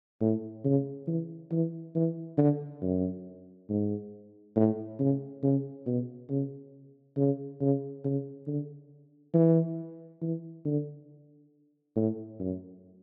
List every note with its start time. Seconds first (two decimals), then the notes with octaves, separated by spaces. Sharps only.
0.21 A2
0.65 C#3
1.07 E3
1.52 E3
1.95 E3
2.38 D3
2.82 F#2
3.69 G#2
4.56 A2
5.00 C#3
5.43 C#3
5.86 B2
6.30 C#3
7.17 C#3
7.61 C#3
8.04 C#3
8.47 D3
9.34 E3
10.22 E3
10.65 D3
11.96 A2
12.39 F#2